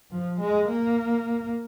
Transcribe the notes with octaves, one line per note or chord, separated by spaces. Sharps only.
F3
G#3
A#3